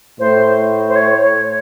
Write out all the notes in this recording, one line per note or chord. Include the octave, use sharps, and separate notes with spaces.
A2 C5
C5
C#5
C#5